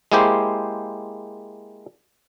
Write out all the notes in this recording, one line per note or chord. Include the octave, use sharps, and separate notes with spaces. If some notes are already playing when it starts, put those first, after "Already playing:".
G#3 A#3 E4 G4 C5